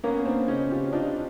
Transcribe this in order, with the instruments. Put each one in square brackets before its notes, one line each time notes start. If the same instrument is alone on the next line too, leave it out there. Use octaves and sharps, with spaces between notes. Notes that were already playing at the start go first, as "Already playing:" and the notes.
[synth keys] A#3 [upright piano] B3 C#4
[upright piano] C4 D4
[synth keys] C#3 [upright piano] C#4 D#4
[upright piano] F4 G4
[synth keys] D4 [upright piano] D#4 F4